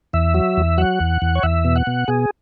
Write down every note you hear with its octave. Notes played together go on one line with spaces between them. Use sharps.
E2 E5
F#3
E2
F#3 F#5
E2
E2
C#5
E2 E5
B2
F#5
B2
B2 G#4